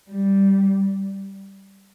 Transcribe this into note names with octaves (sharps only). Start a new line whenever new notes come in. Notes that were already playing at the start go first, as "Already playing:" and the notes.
G3